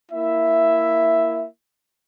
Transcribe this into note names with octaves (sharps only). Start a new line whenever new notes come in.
A#3 E4 E5